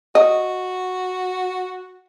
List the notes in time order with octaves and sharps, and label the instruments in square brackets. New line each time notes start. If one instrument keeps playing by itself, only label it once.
[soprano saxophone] F#4 [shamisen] D#5